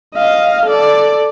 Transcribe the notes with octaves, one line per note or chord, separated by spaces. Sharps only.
D#5 F5
A4 D5